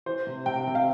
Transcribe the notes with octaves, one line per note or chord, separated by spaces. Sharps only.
E3 C5
C3
C3 G5
C3
F5